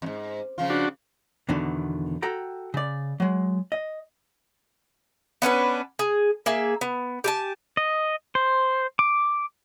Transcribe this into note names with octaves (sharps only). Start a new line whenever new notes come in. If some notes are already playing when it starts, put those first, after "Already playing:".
F2 G#2
C#3 F3 F4
D4 F#4
E2 B2 D3 D#3
F#4 A4 G5 A#5
C#3 D5
F#3 G#3
D#5
B3 C#4 D4 B4
G#4
A#3 G#4 E5
B3
G4 G#5 A5
D#5
C5
D6